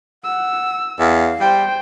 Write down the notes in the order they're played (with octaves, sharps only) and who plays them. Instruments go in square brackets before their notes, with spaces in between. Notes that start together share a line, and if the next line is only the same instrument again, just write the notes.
[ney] F#5 [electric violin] E6
[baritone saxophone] E2 [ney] F5
[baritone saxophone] G3 [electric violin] C5 G5